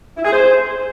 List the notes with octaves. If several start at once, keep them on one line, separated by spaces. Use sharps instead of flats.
E4
G#4
C5